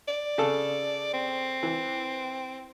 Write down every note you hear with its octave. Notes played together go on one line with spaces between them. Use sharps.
D5
C#3 A4
C4
E3